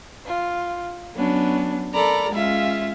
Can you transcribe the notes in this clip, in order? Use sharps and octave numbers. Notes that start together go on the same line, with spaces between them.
F4
F#3 B3 C#4 D4
A4 A#4 D5 A#5 B5
G#3 C#4 F4 E5 F5